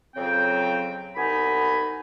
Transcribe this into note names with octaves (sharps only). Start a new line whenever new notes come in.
F2 C#3 F#3 C4 G5
C2 B3 D#4 G#5 B5